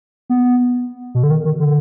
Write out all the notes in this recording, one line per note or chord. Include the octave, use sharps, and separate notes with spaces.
B3
B2
D3
D#3
D#3
D3